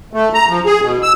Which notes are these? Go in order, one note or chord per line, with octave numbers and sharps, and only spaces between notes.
A3
A#5
F3
G#4
B2
E6